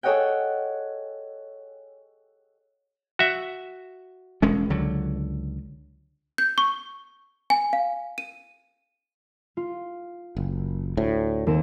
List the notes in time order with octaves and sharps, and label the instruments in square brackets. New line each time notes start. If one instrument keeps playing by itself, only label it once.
[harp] G#4 A4 C#5 D#5 F#5 G5
[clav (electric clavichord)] F#4 E5
[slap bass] E1 G#3 C#4
C#2 D3 F#3
[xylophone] G6
C#6
G#5
F5
D#7
[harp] F4
[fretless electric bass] F#1
D2 A2
[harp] D#2 C4 E7